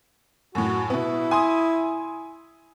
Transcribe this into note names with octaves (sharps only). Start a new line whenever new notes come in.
F#2 A2 F#4
B2 B3 E4
G#5 C6 D#6